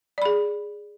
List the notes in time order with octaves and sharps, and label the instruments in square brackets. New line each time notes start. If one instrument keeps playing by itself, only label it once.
[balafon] D5
B5
G#4